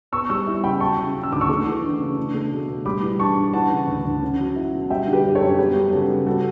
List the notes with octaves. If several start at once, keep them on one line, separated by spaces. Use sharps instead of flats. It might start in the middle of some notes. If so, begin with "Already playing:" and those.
B3 C#6 E6
G3 C#6 E6
E4
C#3 G5 B5
F#3 A5 C#6
C#3
C#4
E6
D2 D6
C#6 E6
A3
E3
D4
C#3
D4
A3
B2
B2
G3 B5 D6
E3
D4 A5 C#6
G2
E3 F#5 A5
C#3
D2
D2
C#4
F#3
E4
B2
G3 E5 G5
D3
G4 B4
F#2
A4 C#5
F#2
B3 G4 B4
G3
C#3 F#4 A4
C#3
G3 F#4 A4